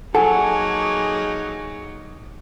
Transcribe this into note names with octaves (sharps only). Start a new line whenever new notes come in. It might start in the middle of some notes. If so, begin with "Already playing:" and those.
F#3 A#3 D#4 G#4 A4 F#5 G#5